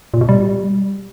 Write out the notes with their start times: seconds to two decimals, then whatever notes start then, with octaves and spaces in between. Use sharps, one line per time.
0.14 A#2
0.21 B2
0.29 G3